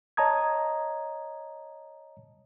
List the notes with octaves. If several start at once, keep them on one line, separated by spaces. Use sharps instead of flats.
C#5 D#5 A5 A#5 D#6 G#6